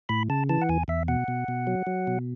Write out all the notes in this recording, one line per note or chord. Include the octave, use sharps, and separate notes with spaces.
A2 B5
C#3 A5
E3 A5
F#5
E2 G#5
E2 E5
B2 F#5
B2
B2
F#3
F#3
B2